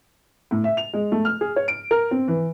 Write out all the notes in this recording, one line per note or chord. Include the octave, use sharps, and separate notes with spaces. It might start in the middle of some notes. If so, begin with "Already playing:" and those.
A2
E5
F7
G#3
A3
F6
G#4
C#5
D7
A#4
C4
E3